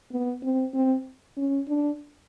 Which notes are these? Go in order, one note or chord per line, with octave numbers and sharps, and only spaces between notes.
B3
C4
C4
C#4
D4